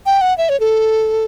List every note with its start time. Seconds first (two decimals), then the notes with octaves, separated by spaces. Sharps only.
0.06 G5
0.21 F#5
0.38 E5
0.49 C#5
0.60 A4